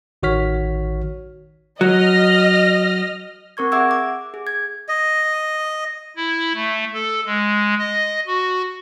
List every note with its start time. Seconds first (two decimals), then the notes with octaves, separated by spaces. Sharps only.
0.23 A1 D#3 F#4 C#5 F6 B6
1.81 F#3 D#5 F6 A#6
3.57 C4 A#4 C#6 G#6
3.72 G#4 E5 F#5 D6 E6 G#6
3.91 D6
4.34 G#4
4.47 G#6
4.88 D#5
6.16 E4
6.54 A3
6.94 A4
7.26 G#3
7.78 D#5
8.27 F#4